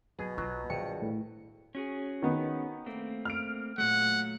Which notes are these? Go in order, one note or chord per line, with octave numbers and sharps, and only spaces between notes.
B2 F#3 G#4
B1 F#3 F4
A#1 G2 D#3 C#7
A2
C#4 F#4 G#4
D#3 B3
A3 A#3 C4
F6 D7
A#2 F#3 A3 F#5